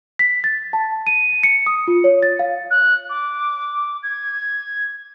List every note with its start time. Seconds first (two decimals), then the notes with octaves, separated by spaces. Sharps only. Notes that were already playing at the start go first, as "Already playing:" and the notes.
0.19 B6
0.44 A6
0.73 A5
1.07 D#7
1.43 C#7
1.66 D#6
1.88 F4
2.04 C#5
2.23 A6
2.39 F5
2.70 F#6
3.09 D6
4.02 G#6